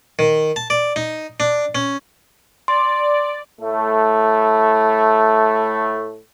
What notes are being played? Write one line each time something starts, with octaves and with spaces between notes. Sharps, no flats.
D#3
A5
D5
D#4
D4
C#4
D5 C6
A2 A3